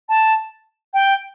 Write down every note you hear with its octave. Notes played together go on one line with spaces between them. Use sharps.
A5
G5